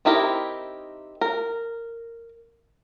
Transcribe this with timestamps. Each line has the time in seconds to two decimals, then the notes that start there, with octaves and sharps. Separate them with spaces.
0.05 C4 D#4 E4 G4 A#4
1.21 A#4